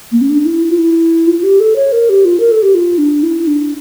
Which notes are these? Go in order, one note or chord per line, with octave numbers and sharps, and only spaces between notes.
A#3
C#4
D4
E4
F4
E4
F4
F4
G4
A4
C#5
A#4
G4
F4
A#4
A4
G4
F4
D4
E4
E4
D4